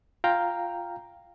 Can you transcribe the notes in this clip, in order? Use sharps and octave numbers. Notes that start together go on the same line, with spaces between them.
F4 F5 G5 A#5